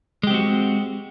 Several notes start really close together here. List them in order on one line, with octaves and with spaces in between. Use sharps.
G#3 G4 C4 F#4